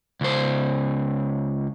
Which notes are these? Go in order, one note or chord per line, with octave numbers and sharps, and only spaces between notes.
C#2 C5